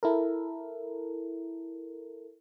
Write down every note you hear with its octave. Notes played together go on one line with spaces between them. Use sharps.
E4 A4 A#4